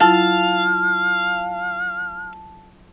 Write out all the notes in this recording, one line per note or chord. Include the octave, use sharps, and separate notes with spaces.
F#3 E4 F4 F5 A5